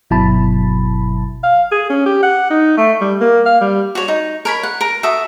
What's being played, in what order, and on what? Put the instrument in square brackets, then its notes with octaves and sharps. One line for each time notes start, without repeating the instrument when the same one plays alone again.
[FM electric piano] G1 B2 F#3 E4 A5 B5
[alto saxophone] F5
G#4
C#4
G4
F#5
D#4
A3
G3
A#3
F5
G3
[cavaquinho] F#4 C#5
D#4
A#4 C#5 B5
F#5
A#4
F#4 A4 E5 D#6